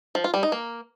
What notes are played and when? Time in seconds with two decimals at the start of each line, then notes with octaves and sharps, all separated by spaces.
0.15 F3
0.24 F4
0.34 G3
0.43 D#4
0.52 A#3